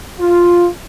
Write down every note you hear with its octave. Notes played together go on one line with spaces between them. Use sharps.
F4